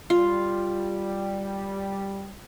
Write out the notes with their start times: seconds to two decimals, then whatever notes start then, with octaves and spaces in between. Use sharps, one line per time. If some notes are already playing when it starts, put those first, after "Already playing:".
0.10 G3 F4